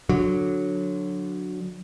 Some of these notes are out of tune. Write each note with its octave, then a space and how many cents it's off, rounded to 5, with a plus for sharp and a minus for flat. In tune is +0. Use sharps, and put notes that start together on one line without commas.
D3 +0 F#3 -15